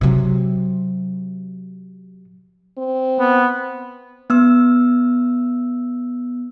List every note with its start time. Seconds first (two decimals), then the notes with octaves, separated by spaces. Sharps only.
0.01 C3 F#3
2.78 C4
3.19 B3
4.30 B3 E6